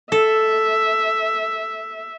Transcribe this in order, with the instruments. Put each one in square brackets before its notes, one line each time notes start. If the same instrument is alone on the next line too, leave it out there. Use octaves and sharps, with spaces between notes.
[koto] A4 [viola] E5